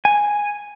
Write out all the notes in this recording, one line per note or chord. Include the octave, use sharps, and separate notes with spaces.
G#5